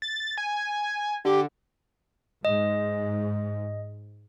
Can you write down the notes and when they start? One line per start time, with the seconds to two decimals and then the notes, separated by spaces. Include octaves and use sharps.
0.02 A6
0.38 G#5
1.25 D3 G4
2.45 G#2 D#5